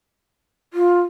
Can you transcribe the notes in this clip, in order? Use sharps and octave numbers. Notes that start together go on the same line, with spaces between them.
F4